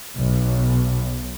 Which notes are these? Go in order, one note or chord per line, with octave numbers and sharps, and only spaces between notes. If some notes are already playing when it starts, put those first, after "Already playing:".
B1